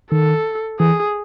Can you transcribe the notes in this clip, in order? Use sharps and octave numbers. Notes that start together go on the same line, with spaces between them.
D#3 A4
E3 G#4